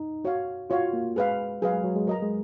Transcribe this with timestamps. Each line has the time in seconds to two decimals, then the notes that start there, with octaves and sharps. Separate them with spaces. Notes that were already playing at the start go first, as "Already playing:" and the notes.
Already playing: D#4
0.25 F#4 C#5 F5
0.70 F4 F#4 C#5 F5
0.93 A#3
1.16 G#3 G#4 B4 F5
1.62 F#3 G#4 B4 F5
1.73 G#3
1.84 F#3
1.96 G#3
2.07 F#3 A#4 D#5 A#5
2.22 G#3